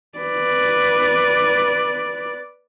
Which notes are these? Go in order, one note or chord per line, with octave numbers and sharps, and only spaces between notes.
B4 D5